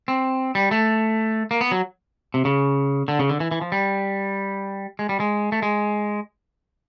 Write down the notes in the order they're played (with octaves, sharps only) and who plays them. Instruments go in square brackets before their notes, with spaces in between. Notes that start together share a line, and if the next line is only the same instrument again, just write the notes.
[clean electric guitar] C4
G3
A3
A#3
B3
F#3
C3
C#3
D3
C#3
D3
E3
E3
F3
G3
G#3
G3
G#3
A3
G#3